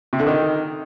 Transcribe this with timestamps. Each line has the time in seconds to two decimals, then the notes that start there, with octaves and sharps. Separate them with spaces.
0.13 C3
0.20 D3
0.27 D#3